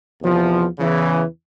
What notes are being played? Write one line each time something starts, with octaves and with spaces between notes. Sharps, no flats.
E2 C3 F3
E2 C#3 E3